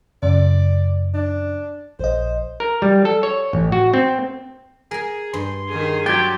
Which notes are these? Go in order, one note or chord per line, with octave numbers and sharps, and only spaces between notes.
F#2 C#3 D5
D4
A#1 C5 D#5
A#4
G3
A4
C#5
A1
F#4
C4
G#4 A#4 G#5
G2 C6
D#3 G#4
F#3 G4 G5 C6 G#6 A6